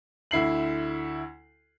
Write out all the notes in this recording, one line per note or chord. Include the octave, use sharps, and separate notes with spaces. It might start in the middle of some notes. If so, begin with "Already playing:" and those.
D2 E4 C7 F#7